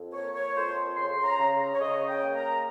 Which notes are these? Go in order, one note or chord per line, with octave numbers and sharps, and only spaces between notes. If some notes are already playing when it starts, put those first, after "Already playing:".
Already playing: F2
A#3 C#5
C#5
F2 C5
C#3 C6
A#5
C#3
C#5
C#3 D#5
G5
A#3
A#5